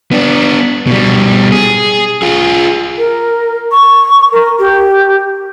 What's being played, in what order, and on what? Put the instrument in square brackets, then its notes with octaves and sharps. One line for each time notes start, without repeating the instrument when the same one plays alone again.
[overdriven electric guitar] B3 D4
B2 G3
G#4
F4 G#4
[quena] A#4
C#6
A#4
G4